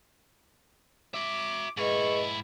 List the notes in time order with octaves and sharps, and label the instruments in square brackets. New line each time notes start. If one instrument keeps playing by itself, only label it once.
[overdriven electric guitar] F#4 E5 [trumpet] D6
[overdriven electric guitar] G#2 E4 [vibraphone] G#4 B4 D#5 [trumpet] C#6